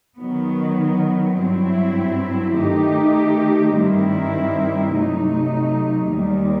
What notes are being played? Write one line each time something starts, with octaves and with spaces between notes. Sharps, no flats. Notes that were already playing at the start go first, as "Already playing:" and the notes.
D#3 F#3 B3
G2 F#3 C4 E4
D#3 A3 D#4 G4
G2 D#3 G3 C4 E4
C3 F#3 A3 D#4
D#2 D#3 G3